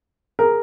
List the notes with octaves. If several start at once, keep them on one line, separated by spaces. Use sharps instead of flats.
G#4 A#4